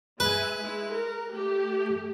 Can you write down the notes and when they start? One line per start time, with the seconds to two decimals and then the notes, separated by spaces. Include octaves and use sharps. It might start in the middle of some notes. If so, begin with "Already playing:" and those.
0.20 G#3 B4 E5 G#5
0.60 G#3 E4
0.92 A#4
1.34 A3 G4